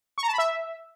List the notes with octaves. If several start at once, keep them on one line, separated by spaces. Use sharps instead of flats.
C#6
A#5
A5
B5
E5